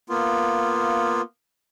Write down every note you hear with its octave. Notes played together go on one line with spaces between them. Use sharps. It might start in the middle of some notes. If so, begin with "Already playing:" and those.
A#3 B3 F4